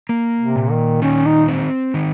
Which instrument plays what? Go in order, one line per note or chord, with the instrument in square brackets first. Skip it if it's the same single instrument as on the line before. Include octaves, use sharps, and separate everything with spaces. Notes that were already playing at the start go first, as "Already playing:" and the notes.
[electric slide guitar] A#3
[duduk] C3
[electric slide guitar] A#2
[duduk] D#3
[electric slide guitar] D#3 [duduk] C#4
[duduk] D#4
[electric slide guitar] C4
D#3